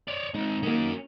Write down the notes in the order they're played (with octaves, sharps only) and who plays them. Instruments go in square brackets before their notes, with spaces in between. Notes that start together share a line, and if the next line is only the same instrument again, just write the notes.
[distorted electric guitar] C#5 D5
[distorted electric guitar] G#3 C4 [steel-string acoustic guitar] D#4
[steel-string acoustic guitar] D#3 A#3 [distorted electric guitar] C#4 F#4